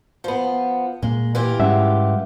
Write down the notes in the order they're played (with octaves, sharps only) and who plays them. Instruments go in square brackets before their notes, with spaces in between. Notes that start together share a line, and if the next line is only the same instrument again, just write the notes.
[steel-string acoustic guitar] F3 B3
[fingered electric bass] A#2 A#3 [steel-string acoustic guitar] G#3
[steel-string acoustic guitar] E3 F4 G4
[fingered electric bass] G#2 G3 C#4 [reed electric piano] G#3 E5 F#5